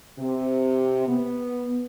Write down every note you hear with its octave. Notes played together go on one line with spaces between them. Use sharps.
C3
B3